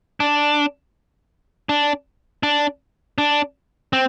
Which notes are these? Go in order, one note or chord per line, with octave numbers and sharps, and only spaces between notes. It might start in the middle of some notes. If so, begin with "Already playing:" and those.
D4
D4
D4
D4
C4